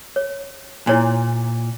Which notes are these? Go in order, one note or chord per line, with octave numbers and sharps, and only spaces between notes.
C#5
A#2 E4 C#5 G#5